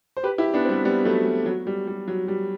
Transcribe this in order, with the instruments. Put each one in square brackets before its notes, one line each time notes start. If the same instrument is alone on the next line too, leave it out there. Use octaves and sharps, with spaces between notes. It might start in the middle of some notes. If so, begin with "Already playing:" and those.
[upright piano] C5
G4 B4
E4 G4
B3 D4
C4
G3 B3
G3 B3
F#3 A3
G3
F#3
G3
G3
F#3
G3